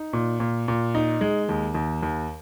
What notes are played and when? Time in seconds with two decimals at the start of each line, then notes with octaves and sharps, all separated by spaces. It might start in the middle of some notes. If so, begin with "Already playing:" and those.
Already playing: D#4
0.13 A#2
0.40 A#2
0.68 A#2
0.95 D#4
1.21 G#3
1.49 D#2
1.75 D#2
2.03 D#2